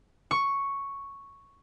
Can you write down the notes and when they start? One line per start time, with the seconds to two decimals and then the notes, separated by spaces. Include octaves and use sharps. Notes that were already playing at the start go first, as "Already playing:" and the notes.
0.31 C#6